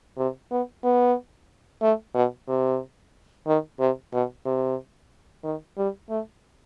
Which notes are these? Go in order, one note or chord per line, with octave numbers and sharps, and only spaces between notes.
C3
B3
B3
A3
B2
C3
D#3
C3
B2
C3
D#3
G3
A3